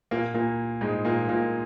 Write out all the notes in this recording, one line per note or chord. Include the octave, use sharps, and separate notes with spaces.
A#2 A#3
A#2 A#3
G#2 G#3
A#2 A#3
A#2 A#3